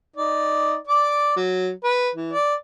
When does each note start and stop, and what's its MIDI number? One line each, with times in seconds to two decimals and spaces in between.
0.16 0.76 63
0.16 0.76 74
0.87 1.35 74
0.87 1.35 86
1.36 1.70 54
1.84 2.09 71
2.16 2.33 52
2.33 2.54 74